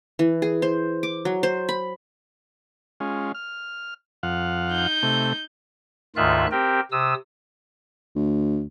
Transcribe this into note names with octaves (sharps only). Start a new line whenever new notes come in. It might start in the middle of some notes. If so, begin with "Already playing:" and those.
E3
G#4
C5
D6
F#3
C5
B5
G#3 C#4 F4
F6
F2 F5 F#5
D#4 G6
C3 A3
D2 G#2 D#3 F4 E5 F#6
C4 G4 A#4 G5
C3 D#6 E6
D2